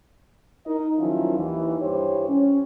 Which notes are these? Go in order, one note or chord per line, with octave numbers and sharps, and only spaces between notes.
D#4 A#4 D#5
D#3 F3 F#3 C#4 E4 F4
D#2 E3
G2 E3 G4 C5 C#5
C#4